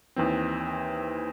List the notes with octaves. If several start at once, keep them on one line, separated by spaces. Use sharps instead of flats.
D#2 E3 C4